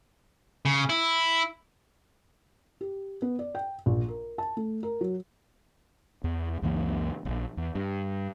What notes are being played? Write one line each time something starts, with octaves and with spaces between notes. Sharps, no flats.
C#3
E4
G4
B3
D5
G5
A#1
A#4
A5
A3
A#4
F#3
E2
C#2 F#2 E3 A#3
D#1 A#1
E2
G2